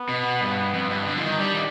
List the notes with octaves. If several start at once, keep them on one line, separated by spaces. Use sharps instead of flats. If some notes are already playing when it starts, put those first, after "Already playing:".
Already playing: B3
B2
G2
F2
G2
D3
F3
D#3
D#4
G3 D4
D#3 D4